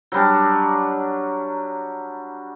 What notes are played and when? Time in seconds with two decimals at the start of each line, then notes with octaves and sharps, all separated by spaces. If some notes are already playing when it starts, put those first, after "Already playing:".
0.12 F#3 G3 D4